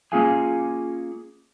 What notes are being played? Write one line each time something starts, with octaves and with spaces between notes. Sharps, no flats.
A#3 C#4 F4 G#4 F5 G#5